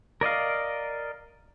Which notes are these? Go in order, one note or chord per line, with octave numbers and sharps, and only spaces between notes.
A#4 D5 D#5 F5